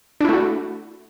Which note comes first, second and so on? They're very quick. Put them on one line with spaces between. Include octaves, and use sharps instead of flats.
D4 E4 A3 F#4